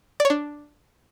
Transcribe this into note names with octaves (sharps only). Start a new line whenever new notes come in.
D5
C#5
D4